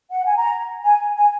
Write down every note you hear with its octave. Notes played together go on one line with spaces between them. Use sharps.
F#5
G#5
A#5
G#5
G#5